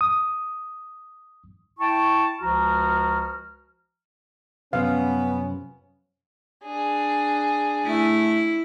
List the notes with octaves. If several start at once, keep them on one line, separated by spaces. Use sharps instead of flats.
D#6
E4 G5 A5 C#6
C#2 F3 F#4 A#5 F6
F#2 C3 F3 B3 C#4 F5
D4 G#4
A3 E4